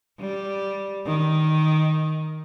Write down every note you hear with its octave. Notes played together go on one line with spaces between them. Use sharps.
G3
D#3